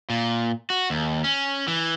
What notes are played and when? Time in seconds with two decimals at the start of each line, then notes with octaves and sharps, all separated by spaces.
0.10 A#2
0.70 F#4
0.90 D#2
1.24 C#4
1.68 E3